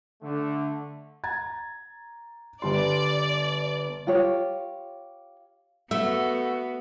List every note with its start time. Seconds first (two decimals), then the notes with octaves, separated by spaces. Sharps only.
0.22 D3 A3
1.24 A#5 G#6 A6
2.62 G1 G3 D5 C6
4.07 F4 G4 C#5
5.91 A3 B3 F#4 E5